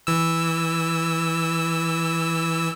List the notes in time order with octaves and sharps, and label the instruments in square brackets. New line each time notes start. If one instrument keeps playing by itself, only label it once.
[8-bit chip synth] E3 E6